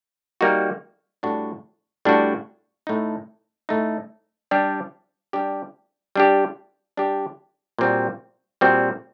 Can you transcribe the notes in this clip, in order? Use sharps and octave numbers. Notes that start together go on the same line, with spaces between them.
G3 A#3 D#4 F#4
A2 G3 D4 F#4
A2 G3 D4 F#4
A2 A3 D#4
A2 A3 D#4
G3 D4 G4
G3 D4 G4
G3 D4 G4
G3 D4 G4
A#2 G3 C4 F#4
A#2 G3 C4 F#4